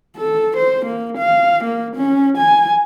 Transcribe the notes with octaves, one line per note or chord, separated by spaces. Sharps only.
A4
C5
A#3
F5
A#3
C#4
G#5